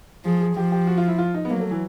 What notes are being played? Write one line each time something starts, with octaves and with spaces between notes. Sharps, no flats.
F3 G#4
G#4
F3 G4
G4
F#4
F4
E4
F4
D#4
B3
F#3 A#3
A3
E3